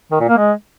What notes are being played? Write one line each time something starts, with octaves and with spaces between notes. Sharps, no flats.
D#3
A#2
A#3
G#3